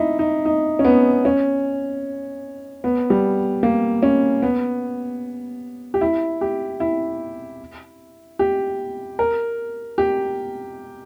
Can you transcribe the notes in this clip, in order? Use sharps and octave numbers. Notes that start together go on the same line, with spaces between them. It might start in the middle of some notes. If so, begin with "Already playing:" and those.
Already playing: D#4 E4
D#4
D#4
C#4
B3
C#4
B3
G3
A#3
C#4
B3
G4
E4
G4
E4
G4
A#4
G4